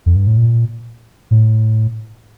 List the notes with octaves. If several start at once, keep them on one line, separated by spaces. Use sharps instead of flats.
F2
G2
A2
A#2
A2